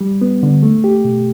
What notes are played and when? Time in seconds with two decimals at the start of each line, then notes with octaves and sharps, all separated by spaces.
0.01 G3
0.22 B3
0.43 D3
0.63 A3
0.84 G4
1.05 B2